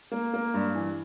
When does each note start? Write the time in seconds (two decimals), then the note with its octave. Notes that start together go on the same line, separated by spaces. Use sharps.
0.12 A#3
0.34 A#3
0.54 G2
0.75 E3